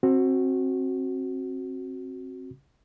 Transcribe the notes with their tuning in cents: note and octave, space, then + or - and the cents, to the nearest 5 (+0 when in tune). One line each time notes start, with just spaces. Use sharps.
C4 +25 F#4 +0